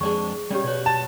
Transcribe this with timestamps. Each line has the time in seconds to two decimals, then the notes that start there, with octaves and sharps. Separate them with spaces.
0.01 F2 G#3 D4 G#4 D5 C#6
0.50 G3 C#4 G4 C#5 D5
0.64 B2 F#4 C#5 D5
0.86 A5